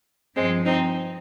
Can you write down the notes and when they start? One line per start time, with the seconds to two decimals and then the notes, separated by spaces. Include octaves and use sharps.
0.36 G2 F3 G#3 C4
0.65 C4 D#4